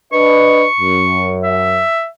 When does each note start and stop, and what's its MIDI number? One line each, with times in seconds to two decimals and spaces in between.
0.13 0.66 62
0.13 0.66 71
0.13 0.66 75
0.13 1.36 85
0.79 1.82 42
1.44 2.08 76